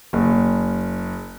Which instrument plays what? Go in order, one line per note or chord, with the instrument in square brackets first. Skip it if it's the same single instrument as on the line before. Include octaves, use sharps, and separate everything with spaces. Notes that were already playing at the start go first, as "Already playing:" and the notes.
[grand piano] F#1